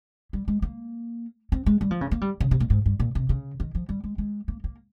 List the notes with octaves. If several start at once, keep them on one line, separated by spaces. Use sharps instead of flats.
G3
G#3
A#3
C4
G#3
G3
F3
C#3
A#3
G3
C#3
C3
A#2
G#2
G2
A#2
C3
C#3
D#3
F3
G3
G#3
G#3
A#3
A#3